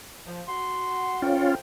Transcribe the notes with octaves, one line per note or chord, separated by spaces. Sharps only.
F3
F#4 C6
A2 F3 C#4 F4 G5